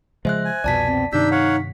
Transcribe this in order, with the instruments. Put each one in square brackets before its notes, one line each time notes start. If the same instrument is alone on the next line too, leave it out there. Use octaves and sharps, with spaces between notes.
[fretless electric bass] C#3 F3 G#3 [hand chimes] C5 E5 F#6
[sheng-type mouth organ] G#5
[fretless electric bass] C2 F2 B2 [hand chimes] D5 A5 B6
[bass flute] C4
[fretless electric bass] G2 C3 D#3 [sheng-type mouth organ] D4 E6 G6 [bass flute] D#4 [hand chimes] B6
[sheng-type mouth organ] C#5 F5 F#5